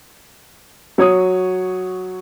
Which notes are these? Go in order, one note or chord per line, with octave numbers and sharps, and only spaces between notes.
F#3 C#5 D#6